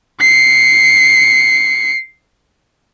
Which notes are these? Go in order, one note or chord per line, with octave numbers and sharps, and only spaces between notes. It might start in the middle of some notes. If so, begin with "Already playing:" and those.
C7 C#7